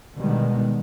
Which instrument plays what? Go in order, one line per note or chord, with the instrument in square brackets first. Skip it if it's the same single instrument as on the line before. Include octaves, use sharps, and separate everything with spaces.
[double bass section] B2 D3 D#3 G3 G#3 B3